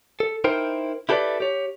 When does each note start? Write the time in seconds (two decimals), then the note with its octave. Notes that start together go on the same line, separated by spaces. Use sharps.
0.20 A4
0.44 D#4 E4 A#4 C5 G5
1.09 E4 G4 A4 B4 C5 D5
1.40 G4 C#5